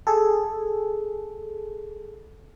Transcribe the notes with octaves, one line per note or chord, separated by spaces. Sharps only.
G#4 A4